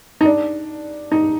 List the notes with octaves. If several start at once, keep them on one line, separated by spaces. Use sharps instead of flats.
D#4
D4
D#4